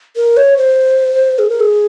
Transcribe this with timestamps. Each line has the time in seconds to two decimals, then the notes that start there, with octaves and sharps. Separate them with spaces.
0.16 A#4
0.37 C#5
0.57 C5
1.39 G#4
1.50 A#4
1.60 G#4